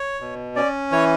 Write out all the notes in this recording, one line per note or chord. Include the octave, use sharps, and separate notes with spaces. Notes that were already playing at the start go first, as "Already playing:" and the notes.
Already playing: C#5
B2
C#4 D5
E3 C#5